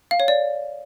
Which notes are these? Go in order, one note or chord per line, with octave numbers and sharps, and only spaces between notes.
F5
C#5
D5